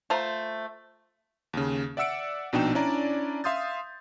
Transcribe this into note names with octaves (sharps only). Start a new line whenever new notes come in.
A3 F4 C5 A#5
D#2 C#3
D5 E5 F#5 E6 C#7 D7
A#1 B2 D4 D#4 G5 E7
C#4 D4 E4 D5 A#5
E5 F5 C6 D#6 G6 A6